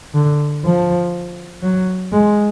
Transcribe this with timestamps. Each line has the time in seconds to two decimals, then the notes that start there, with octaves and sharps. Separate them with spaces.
0.14 D3
0.64 F3
1.63 F#3
2.12 G#3